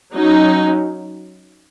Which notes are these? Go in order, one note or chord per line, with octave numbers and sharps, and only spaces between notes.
F#3 C#4 D#4